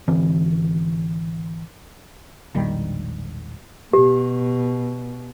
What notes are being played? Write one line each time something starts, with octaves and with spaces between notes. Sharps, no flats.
G#1 D3 E3 C4
E1 A#1 D#3 G3
B2 G4